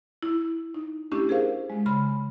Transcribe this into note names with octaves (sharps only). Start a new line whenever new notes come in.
E4
D#4
A3 C#4 D4 E4 G4
G#4 A#4 C5 F5
G#3
C#3 B5 C6 F6